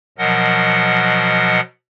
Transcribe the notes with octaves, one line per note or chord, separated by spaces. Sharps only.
B2 F3 F#3 A#4 D#5 F#5